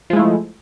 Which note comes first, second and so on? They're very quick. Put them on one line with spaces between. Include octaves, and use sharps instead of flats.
F3 G#3 E4 A3